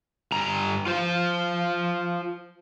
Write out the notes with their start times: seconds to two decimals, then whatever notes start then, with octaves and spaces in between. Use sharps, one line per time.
0.32 G2 A#5
0.87 F4 C5